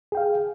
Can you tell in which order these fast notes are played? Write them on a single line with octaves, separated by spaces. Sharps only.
G#4 G5 F5